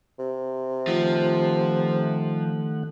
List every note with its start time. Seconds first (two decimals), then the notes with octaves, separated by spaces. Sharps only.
0.19 C3
0.87 D#3 F3 A3 F#5